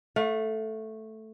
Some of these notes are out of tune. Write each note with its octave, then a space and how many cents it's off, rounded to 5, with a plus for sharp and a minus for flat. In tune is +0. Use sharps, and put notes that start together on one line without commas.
A3 +0 F5 +40